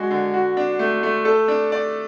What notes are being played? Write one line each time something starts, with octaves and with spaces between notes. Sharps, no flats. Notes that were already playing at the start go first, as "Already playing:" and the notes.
Already playing: G#3 D4 F#4
D3
F#4
D4
A3
A3
A4
D4
D5